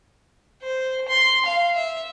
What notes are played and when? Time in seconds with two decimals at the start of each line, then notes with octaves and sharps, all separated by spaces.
0.62 C5
1.08 C6
1.45 F5
1.76 E5